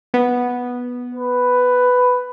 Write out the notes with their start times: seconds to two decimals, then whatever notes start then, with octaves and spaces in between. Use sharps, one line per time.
0.14 B3
1.15 B4